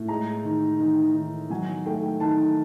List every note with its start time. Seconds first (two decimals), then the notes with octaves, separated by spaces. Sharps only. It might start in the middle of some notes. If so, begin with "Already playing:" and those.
Already playing: A2
0.08 G#3 A#5
0.44 D#3
0.79 D#3
1.14 D#3
1.50 F#3 G#5
1.86 A3 G5
2.20 D#3 A5